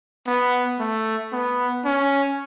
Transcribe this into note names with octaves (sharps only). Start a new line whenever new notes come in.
B3
A3
B3
C#4